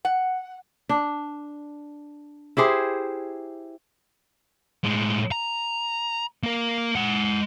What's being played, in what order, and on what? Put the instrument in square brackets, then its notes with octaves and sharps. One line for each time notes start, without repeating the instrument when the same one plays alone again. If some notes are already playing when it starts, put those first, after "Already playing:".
[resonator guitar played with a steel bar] F#5
[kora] D4
E4 G4 G#4 C5
[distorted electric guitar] A2 G#3
A#5
A#3 A#4
G#3 F#5